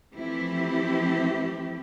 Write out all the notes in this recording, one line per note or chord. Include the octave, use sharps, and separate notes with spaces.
E3 F3 A3 C4 E4 G4